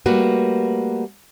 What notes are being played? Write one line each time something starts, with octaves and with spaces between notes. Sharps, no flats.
G3 A3 A#3 F#4 B4